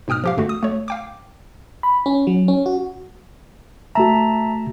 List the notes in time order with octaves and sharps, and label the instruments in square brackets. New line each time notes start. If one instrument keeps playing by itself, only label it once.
[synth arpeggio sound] G#2 B2 G5 D#6 F6
F3 G4 F5
G2 D3 A3 F#4
D#6
A3 C#5
F5 G5 D6
[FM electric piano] B5
C#4
F#3
C#4
F#4
[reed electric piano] C2 A3 F#4 [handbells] E5 A5 A#5